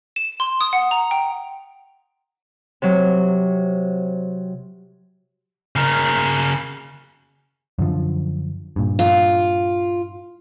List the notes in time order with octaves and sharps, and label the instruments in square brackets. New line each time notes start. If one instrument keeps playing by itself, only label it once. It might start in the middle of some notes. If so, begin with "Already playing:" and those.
[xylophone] E7
C6
D#6
F#5
A#5
G5
[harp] C3 F#3
[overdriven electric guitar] C#3 A#4
[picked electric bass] F#2 D3 F3
G2 A#2
[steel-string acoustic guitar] F4